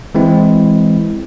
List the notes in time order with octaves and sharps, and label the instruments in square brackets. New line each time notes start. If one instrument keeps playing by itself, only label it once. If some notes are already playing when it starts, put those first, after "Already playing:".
[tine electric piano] E3 G#3 C4 E4